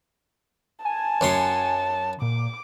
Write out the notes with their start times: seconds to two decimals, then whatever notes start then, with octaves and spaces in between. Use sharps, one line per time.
0.85 G#5 A5
1.21 F#2 F#3 C6
2.22 A#2 D6